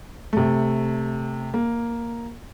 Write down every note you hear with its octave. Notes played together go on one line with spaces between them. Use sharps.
C3 A3
A#3